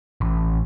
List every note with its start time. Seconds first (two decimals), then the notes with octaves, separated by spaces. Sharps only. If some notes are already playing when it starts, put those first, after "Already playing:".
0.21 A1